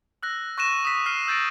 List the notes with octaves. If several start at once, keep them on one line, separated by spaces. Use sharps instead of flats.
E6 F#6 A#6
C#6 F#6 A#6 D#7 E7
D#6 B6
F6 C7 D#7
E6 G6 A6 A#6 D7